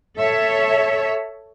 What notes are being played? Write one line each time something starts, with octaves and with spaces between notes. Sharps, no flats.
A4 C#5 E5